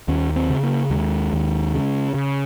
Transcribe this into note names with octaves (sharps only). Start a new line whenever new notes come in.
D#2 C#4
C4
C#3
A#3
D#2 G#3
D#2
C#3
C#3